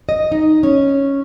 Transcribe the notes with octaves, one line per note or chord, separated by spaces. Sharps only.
D#5
D#4
C#4